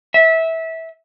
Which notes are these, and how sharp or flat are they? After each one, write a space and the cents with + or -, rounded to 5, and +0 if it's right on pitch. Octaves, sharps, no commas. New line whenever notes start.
E5 -20